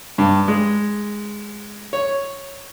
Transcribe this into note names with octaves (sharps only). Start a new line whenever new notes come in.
G2
G#3
C#5